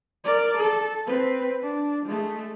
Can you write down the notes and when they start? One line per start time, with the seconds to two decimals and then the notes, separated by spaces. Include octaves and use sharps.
0.24 A#4 D5
0.57 A4
1.07 C4 B4
1.62 D4
2.06 G#3 A3